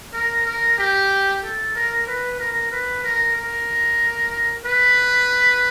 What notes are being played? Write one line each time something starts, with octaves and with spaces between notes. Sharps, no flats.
A#4
A#4
G4
A4
A#4
B4
A#4
B4
A#4
A#4
B4